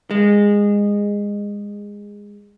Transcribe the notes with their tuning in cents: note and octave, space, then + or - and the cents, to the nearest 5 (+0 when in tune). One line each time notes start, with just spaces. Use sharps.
G#3 -20